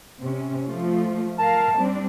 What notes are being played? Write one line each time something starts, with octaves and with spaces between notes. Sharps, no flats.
C3 C#4
F3 A3 F4
A#4 F5 A5
G3 C4 D4